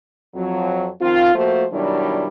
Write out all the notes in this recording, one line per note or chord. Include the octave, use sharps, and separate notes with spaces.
F2 F#3
D#3 F3 C4 F4
F3 A3 A#3 F#4 C5
B2 D#3 F#3 G3 D4 E4